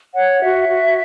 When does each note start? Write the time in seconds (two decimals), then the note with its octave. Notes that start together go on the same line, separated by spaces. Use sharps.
0.15 C#5 F#5
0.42 F#4 E5
0.69 F#4